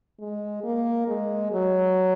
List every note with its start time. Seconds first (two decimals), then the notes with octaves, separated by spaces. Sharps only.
0.20 G#3
0.64 A#3
1.08 G#3
1.52 F#3